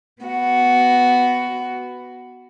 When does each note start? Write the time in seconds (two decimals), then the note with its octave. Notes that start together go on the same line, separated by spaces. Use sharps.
0.23 B3 F#4